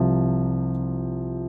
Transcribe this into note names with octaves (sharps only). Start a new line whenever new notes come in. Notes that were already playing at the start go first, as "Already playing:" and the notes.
Already playing: C2 C3 F3